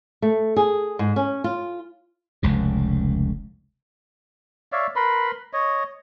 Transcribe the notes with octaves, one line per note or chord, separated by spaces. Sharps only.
A3
G#4
G#2
C#4
F4
F1 C#2 C#3
C#5 D5 E5 F5
A#4 B4 B5 C6
C#5 D#5